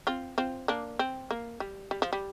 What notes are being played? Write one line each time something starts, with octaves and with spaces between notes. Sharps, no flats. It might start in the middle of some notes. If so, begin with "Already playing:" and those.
C4 F4
C4 F4
A#3 D4
C4
A#3
G3
G3
F3
G3